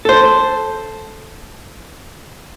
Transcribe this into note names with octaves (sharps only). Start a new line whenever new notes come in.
A4 C5